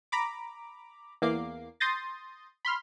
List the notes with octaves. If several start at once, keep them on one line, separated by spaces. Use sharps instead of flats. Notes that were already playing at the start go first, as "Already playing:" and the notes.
A#5 B5 D6
E2 A#3 D6 C7
C6 D#6 G6 A6 A#6
B5 C6 F6